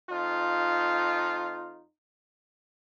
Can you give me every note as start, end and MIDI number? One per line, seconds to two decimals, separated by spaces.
0.10 1.85 41
0.10 1.85 63
0.10 1.85 65